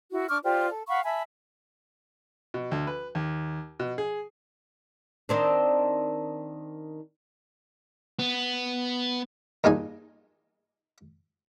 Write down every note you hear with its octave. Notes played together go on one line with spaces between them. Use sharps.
E4 F#4
D4 C#6 D6 F6
F4 G4 C5 D5
A4
F5 F#5 B5 C#6
E5 G#5 A5 B5
B2
D2
B4
D#2
B2
G#4
D#3 C4 D4
B3
G2 A#2 G#3 D#4 G#5